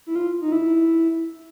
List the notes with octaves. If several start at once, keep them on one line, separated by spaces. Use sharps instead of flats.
E4
F4
D#4
E4